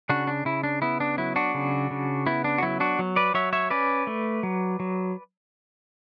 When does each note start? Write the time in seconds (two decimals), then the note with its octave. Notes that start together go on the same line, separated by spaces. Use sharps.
0.09 C#3 D4 F#4
0.27 D4
0.45 C#3 E4
0.64 D4
0.82 B3 E4
1.00 D4
1.18 F#3 E4
1.36 D4 F#4
1.54 C#3
1.91 C#3
2.27 B3 E4
2.44 D4
2.58 F#4
2.63 F#3 E4
2.80 D4 F#4
2.99 F#3
3.16 B4 D5
3.34 F#3 C#5 E5
3.53 C#5 E5
3.70 C#4 B4 D5
4.07 A3
4.43 F#3
4.80 F#3